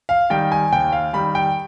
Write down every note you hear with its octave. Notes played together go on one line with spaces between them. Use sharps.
F5
D#3 G3 G5
G#5
D#2 G5
F5
D#3 G3 B5
G5